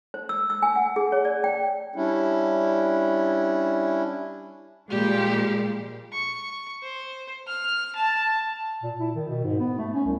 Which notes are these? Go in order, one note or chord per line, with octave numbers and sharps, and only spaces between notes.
C5
E6
E6
G#5
F#5
G#4
C#5
D5
G5
G3 C#4 D4 E4
A#2 F3 G3 G#3 G4
C#6
C5
F6
A5
A#2
E4
D#3
B2
G#2
B3
A3
C#4
C2